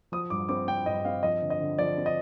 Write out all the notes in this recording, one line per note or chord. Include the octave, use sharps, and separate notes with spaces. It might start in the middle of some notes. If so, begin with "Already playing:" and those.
F3 D#6
G2 D6
C4 D6
C4 G5
G2 D#5
C4 F5
F3 D#5
D3
D#5
D3
F3 D5
C4
D#5